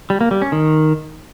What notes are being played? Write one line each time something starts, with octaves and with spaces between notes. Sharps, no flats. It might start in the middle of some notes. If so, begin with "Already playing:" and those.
G3
A#3
G3
C#4
D#3